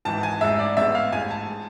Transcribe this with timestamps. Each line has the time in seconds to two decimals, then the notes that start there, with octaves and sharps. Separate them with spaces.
0.05 G#1 G#2 E3 A5
0.23 G#5
0.41 A1 G#2 G#3 E5
0.59 D5
0.77 A1 A2 G#3 B3 E5
0.95 F5
1.13 A1 G#2 G#3 G#5
1.31 A5
1.49 G#3